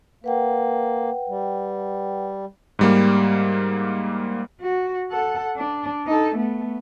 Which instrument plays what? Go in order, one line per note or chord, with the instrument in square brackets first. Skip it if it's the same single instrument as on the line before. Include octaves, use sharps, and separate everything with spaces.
[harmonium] A#3 [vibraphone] B4 F#5 G5
[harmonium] G3
[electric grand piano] G#2 G3 A#3
[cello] F#4
A4 F#5
D4
D#4 A4
A3 B3